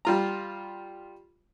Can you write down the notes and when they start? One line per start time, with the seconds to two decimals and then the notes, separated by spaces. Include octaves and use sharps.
0.05 G3 F4 A#5